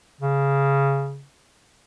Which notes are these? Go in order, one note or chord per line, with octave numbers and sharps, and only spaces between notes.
C#3